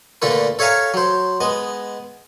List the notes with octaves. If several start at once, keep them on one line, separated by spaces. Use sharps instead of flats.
A#2 D3 A3 A4 B4
A4 C#5 E5 F5 G#5 A#5
F#3 C5
G#3 B3 D#5